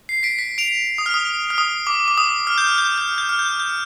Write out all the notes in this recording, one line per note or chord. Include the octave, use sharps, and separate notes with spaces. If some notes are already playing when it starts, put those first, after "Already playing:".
C7
B6 D7
B6
D7 F7
D#6
F6
D#6
F6
D#6
D6
D6
D#6
F6
G6
F6
G6
F6
G6
F6
G6
F6
G6
F6
G6
F6